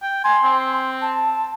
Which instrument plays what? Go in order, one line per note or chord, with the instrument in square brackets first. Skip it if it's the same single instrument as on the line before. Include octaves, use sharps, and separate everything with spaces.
[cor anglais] G5
[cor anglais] G#5 [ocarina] C6
[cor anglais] C4
[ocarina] A5